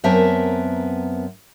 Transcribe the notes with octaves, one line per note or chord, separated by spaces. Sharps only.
F#2 B3 C4 A#4 E5 A5